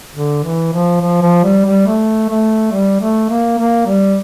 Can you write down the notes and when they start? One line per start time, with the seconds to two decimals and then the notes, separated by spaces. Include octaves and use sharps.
0.15 D3
0.44 E3
0.73 F3
1.01 F3
1.21 F3
1.44 G3
1.65 G3
1.87 A3
2.29 A3
2.72 G3
3.00 A3
3.29 A#3
3.58 A#3
3.87 G3